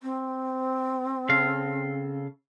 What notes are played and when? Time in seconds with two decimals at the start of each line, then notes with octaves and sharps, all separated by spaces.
0.02 C4
1.29 C#3 A4 F5